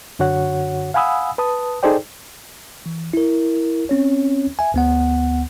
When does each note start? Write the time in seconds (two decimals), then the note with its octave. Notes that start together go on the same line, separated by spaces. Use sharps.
0.19 F#2 D3 F#4 C#5 F#5
0.94 F5 F#5 G#5 B5 D#6 E6
1.38 B4 A5 D#6
1.83 D#4 G#4 A4 C5 D5 G5
2.86 E3
3.13 E4 A#4
3.89 C4 C#4 C#5
4.59 E5 G#5
4.74 D2 B3 F#5